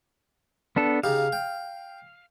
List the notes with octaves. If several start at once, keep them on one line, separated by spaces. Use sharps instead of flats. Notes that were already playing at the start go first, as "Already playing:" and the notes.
B3 D4 A4
C#3 D#4 G4 F5
G5